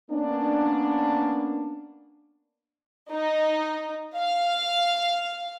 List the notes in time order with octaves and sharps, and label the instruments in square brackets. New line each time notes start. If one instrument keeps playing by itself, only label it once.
[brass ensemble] A#3 B3 C#4 D4
[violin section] D#4
F5